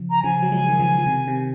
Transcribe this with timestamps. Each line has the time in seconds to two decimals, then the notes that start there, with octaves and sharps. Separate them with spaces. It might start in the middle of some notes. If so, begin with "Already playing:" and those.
Already playing: C#3 F3
0.11 A#5
0.23 C#3 F3 G#5
0.42 F#3
0.52 F3 G#3
0.69 D#3
0.79 C#3 F3
0.98 F3
1.06 C3 D#3
1.27 C3 D#3